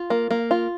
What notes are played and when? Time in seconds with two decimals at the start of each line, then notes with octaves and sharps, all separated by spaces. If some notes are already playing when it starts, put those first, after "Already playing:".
Already playing: F4
0.10 A#3
0.31 A#3
0.51 F4